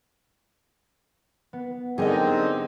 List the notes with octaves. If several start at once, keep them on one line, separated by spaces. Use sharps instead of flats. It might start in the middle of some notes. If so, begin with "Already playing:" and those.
B3
D3 G3 C4 D#4 G#4 A#4 D#5